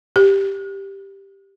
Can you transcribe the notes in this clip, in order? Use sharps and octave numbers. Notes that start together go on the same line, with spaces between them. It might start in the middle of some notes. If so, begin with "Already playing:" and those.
G4